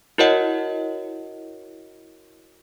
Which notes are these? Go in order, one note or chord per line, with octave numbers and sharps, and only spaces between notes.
E4 F#4 A#4 C#5 D#5 F#5